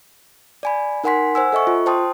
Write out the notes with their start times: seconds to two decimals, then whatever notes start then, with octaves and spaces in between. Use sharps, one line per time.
0.63 D5 G#5 B5
1.04 D#4 A#4 F#5 G#5 C6 B6
1.35 C5 F#5 G#5 E6
1.53 A4 D#5 E5 C#6
1.67 F4
1.86 C5 G5 A5 C6 D#6